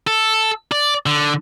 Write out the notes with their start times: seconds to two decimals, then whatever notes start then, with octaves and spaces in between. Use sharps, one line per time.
0.07 A4
0.72 D5
1.06 D3